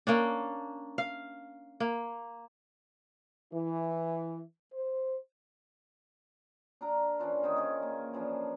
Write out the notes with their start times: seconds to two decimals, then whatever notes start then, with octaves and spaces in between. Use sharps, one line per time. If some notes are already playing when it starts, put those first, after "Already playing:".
0.07 A#3 C#4 D4
0.98 F5
1.80 A#3
3.53 E3
4.72 C5
6.81 D4 A#4 A#5
7.19 E3 C#4 D4 F4
7.43 C3 D#3 D#4 G#4
7.56 D#3 C#4 G#4 D5
7.83 A#3
8.13 E3 F3 C#4 D4